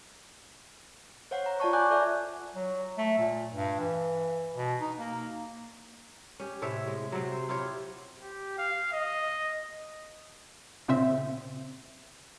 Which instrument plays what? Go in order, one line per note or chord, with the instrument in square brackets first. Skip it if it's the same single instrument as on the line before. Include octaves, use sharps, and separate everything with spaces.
[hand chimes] C5 C#5 F5 F#5
A#5
F4 D5 A5 C#6
F#5 G#5 D6 F#6 G6
A4 D5 E5
[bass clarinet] F#3
A3
A#2
G2
E3
B2
D#4
A#3
[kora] C#4 G4
A2 C3 C#5 E5
G#3
C3 F#3
C5
E4 F4 G4 C#5
[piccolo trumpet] G4
F5
D#5
[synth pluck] A#2 C#3 C4 C5 E5